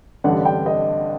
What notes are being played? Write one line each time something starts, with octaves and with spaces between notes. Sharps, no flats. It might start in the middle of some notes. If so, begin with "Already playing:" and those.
A1 G2 D3 F#5
G5
D#5